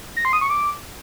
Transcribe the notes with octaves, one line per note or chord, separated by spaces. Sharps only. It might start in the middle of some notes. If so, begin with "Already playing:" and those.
A#6
C6
D#6
C#6
D6